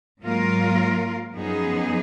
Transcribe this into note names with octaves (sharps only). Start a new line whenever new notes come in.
G#2 F#3 A#3 F4 A#4
F#2 F3 B3 D#4 G#4